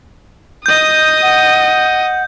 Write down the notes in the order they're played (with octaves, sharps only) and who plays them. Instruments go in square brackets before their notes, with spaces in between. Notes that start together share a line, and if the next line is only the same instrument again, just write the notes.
[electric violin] D#5 D#6 [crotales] G6
[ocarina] F#5